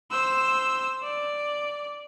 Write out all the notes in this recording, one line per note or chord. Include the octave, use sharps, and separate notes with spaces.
C5 E6
D5